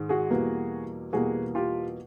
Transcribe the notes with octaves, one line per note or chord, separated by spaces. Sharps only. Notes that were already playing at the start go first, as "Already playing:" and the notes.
Already playing: G#2 D#3 G#3
F#4 G#4
E2 B2 G3 A#3
E2 B2 G3 A#3 F#4 G#4
F4 G4